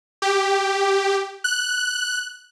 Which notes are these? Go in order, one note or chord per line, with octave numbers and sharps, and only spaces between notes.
G4
F#6